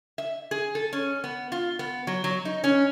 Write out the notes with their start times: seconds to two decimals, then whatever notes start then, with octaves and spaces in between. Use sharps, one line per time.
0.18 E5
0.51 G#4
0.75 A4
0.93 C#4
1.24 B3
1.52 F4
1.79 B3
2.07 F#3
2.24 F#3
2.45 D#4
2.64 C#4